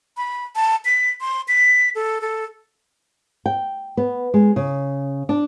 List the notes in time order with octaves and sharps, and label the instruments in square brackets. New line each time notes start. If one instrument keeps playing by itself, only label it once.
[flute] B5
A5
B6
C6
B6
A4
A4
[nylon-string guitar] G5
B3
G#3
C#3
D4